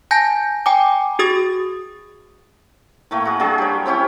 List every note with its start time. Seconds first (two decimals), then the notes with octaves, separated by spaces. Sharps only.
0.11 G#5 A5 G6 A#6
0.66 G5 G#5 A#5 D6
1.19 F#4 G#4 D#6 A6
3.11 A2 A3 A#3
3.25 F#4 G#4
3.40 F#3 G3 D4 G#4
3.58 G4 C#5
3.86 C4 C#4 E4 G4